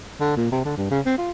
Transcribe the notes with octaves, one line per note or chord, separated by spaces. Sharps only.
D3
A#2
C3
D3
G2
C#3
C4
F4